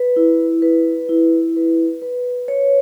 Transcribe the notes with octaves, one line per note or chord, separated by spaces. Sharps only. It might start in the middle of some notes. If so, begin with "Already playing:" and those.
Already playing: B4
E4
B4
E4
B4
B4
C#5